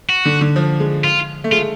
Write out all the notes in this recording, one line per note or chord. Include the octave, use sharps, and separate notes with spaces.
F#4
D3
D3
F3
G#3
F4
A3
G#3 F4